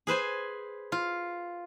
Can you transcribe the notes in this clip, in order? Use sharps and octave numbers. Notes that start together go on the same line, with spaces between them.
G#4 B4 C5 G#5
F4